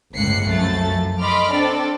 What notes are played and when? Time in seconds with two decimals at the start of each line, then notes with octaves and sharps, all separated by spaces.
0.16 G1 C#2 A2 F#6 C7 C#7
0.49 C2 F#2 F3 A3 A4 A6
1.20 D#5 B5 C6 D6 F6
1.51 C4 D4 A4 D5